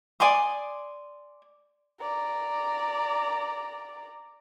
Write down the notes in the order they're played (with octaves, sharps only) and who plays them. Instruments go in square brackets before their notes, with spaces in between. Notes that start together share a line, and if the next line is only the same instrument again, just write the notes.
[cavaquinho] D5 G#5 C6 D#6
[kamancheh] D5 A#5